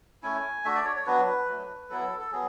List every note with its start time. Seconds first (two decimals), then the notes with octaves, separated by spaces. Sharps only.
0.23 A3 C#4 E4 G#5
0.65 A3 D4 F#4 E5
0.75 D5
0.85 C#5
0.96 C#5
1.06 F#3 B3 D4 F#4 B4
1.48 F#3 A3 D4
1.90 F#3 B3 E4 A4
2.19 A4
2.32 F#3 B3 G#4